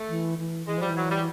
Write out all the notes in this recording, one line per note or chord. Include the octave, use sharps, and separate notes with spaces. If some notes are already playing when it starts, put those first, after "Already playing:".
Already playing: A3
E3
E3
E3 G#3
F3 G3
E3
F#3
G3